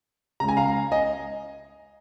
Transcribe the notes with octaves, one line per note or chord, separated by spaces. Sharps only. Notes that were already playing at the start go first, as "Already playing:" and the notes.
C#2 C#3 A#5
G#5
F5 A#5
D#5 G#5